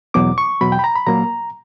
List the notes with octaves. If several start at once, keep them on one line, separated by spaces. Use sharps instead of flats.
E2 B2 F#3 D6
C#6
E2 B2 F#3 B5
G5
B5
A#5
B5
A#2 F#3 A#3 A#5